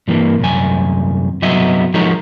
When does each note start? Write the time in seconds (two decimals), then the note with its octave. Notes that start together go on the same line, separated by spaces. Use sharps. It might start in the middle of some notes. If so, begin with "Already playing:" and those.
0.08 G2 E3 A#3
0.39 C2 F#2 G#5
1.42 C2 G2 F#3 B3 D#5 E5
1.94 F3 G#3 D#4 F#4 A#4 C#5